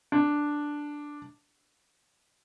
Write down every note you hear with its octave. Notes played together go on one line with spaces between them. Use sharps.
D4